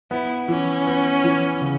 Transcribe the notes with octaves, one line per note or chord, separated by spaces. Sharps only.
B3 E4
E3 C#4
B3
E3
C#3